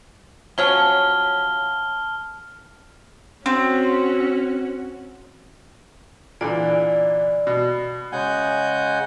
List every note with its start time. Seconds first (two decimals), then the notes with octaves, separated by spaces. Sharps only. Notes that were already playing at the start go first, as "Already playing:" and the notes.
0.58 F3 F#3 C#4 A5 F6 G7
3.46 C4 C#4 F#4
6.41 A#2 D3 E3 D5
7.47 B2
8.12 C#3 G#3 F#5 G#5 G6